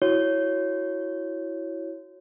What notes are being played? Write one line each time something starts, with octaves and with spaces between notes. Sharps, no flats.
E4 F#4 C#5